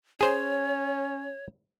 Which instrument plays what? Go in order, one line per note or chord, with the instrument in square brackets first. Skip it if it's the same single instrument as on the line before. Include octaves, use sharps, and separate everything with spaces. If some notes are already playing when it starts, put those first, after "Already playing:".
[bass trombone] C#4 [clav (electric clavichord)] G#4 C5 [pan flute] C#5